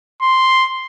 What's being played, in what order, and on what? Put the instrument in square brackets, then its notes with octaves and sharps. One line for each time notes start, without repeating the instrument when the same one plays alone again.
[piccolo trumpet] C6